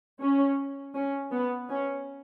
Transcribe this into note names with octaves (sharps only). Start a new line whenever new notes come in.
C#4
C#4
B3
C#4